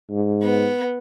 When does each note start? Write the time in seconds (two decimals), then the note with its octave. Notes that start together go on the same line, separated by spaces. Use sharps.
0.10 G#2
0.43 B3